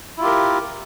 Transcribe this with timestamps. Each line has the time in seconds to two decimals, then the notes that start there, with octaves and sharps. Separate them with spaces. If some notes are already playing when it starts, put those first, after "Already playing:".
0.18 E4
0.20 F4
0.23 G4
0.26 A#4